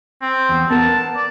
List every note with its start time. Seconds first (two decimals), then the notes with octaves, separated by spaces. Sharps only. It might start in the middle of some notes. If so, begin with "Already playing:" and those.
0.22 C4
0.49 E2
0.70 B3 A#4 F#5 A5
1.16 D5